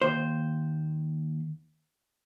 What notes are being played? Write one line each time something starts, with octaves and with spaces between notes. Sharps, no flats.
D#2 C5